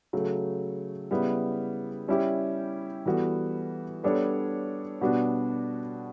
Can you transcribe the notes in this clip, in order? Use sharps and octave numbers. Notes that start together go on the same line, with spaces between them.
C#3 F#3 A3
C#3 G3 B3 E4
G3 C#4 E4 G4
E3 G3 B3 F#4 A4
G3 B3 D4 A4 C#5
B2 G3 B3 D4 F#4